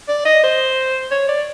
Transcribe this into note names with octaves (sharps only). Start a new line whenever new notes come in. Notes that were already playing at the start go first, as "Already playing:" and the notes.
D5
D#5
C5
C#5
D5